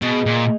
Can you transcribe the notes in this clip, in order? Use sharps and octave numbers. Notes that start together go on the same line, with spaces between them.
B2 G#3 D#4 G#4
A#2